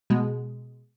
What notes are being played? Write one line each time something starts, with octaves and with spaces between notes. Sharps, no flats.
B2 G#3